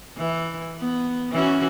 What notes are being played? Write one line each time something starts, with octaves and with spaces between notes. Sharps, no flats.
E3
B3
E3 C#4 F#4